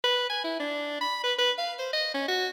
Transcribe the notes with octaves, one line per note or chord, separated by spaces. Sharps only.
B4
G#5
E4
D4
B5
B4
B4
F5
C5
D#5
C#4
F#4